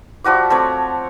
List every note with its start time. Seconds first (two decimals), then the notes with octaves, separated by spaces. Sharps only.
0.24 F3 G3 F#4 D6
0.50 A3 C4 C#5 D5